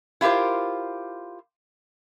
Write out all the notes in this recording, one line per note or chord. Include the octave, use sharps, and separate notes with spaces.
E4 F4 G4 A#4 C5